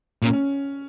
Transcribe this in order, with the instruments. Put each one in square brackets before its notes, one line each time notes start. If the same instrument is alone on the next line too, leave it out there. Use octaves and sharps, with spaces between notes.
[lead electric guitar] A#2 [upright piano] C#4
[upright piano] C#4